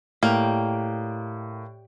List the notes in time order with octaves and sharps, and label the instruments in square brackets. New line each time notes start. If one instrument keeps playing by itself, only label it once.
[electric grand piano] A2 [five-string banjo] A#3 [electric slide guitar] G4 D5 G5